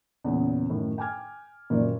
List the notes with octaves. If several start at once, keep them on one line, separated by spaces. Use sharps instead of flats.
E2 A#2 C#3
F#2 A2 D#3
G5 G#5 D6 F6 G#6
F#1 A#2 D#3 D5